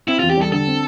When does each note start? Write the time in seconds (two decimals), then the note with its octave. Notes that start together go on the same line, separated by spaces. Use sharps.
0.08 C4 E4
0.19 F4
0.23 E2
0.30 G4
0.37 G3 A4
0.52 D3 A4
0.67 C4